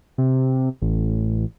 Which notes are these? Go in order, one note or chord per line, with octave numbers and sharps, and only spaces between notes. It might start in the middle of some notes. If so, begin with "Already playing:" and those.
C3
A1